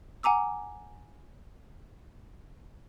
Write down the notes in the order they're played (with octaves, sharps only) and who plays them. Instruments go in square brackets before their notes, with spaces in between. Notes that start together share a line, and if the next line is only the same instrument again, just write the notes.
[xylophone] F#5 G#5 A#5 D6 E6